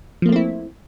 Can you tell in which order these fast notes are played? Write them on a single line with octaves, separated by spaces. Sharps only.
F3 A#3 A3 C4 E4